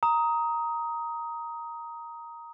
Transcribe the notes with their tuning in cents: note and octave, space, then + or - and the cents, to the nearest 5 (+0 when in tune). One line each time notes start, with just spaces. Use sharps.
A#5 +0 D#6 +15